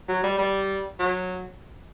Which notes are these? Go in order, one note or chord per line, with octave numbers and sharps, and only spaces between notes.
F#3
G3
G3
F#3